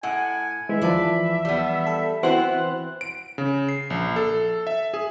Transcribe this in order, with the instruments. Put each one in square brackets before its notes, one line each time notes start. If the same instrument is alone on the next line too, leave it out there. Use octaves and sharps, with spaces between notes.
[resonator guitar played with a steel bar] A2 F#5 [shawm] G#5
[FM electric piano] E3 [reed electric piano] G#3 [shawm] E5
[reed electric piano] D#2 F3 A5 [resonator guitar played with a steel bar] B4 D5
[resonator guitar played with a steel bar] G3 B3 [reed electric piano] D5
[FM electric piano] A4
[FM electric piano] E3 C4 F#6 [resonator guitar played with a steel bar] B3 C5 [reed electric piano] F#4 F#5 C6
[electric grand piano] D7
C#3
C7
A#1
A4
E5
G#4